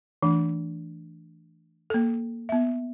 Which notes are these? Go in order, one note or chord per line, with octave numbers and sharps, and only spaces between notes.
E3 A3 D4
A#3 A4
B3 E5